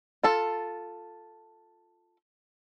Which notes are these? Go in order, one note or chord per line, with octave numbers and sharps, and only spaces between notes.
F4 A4